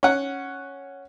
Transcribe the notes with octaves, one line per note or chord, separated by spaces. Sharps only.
C#4 F#5